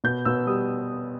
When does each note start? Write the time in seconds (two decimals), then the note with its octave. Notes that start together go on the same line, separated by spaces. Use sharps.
0.04 B2 G6
0.25 B2 E6
0.47 G3 D#6